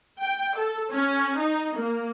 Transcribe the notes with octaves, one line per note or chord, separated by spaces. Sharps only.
G5
A4
C#4
D#4
A#3